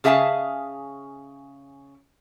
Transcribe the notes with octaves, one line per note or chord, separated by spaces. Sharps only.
C#3 G#4 E5 F5 G#5 A5